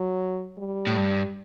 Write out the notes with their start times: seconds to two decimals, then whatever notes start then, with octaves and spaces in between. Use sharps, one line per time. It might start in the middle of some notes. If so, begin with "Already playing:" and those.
Already playing: F#3
0.58 G3
0.87 A2
0.97 G2